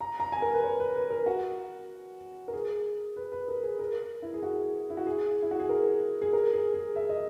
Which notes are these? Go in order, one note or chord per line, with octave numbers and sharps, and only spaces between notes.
A#5
A#5
G#5
A#4
B4
C#5
B4
B4
A#4
F#4
A#4
G#4
B4
B4
A#4
G#4
A#4
E4
G#4
F#4
E4
F#4
G#4
E4
F#4
G#4
A#4
G#4
A#4
G#4
G#4
E5
D#5